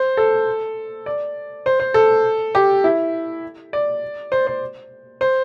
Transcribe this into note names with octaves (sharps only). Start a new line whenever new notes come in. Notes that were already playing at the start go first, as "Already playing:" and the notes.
Already playing: C5
A4
D5
C5
C5
A4
G4
E4
D5
C5
C5
C5